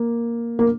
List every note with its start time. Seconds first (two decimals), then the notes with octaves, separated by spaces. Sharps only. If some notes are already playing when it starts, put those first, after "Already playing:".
Already playing: A#3
0.59 A#3